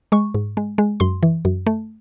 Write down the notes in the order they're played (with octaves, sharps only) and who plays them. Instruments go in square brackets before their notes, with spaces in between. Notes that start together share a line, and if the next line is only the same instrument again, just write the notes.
[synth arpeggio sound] G#3 C#6
G#2
G#3
G#3
F#2 C6
E3
F#2
A3